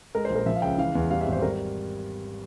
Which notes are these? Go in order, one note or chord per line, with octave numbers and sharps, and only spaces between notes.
G#3 A#4
C5
A#1
A#4
F3 E5
F5
C#2 G5
E3 F5
E2
G3 F5
E5
G#1
C5
G3 A#4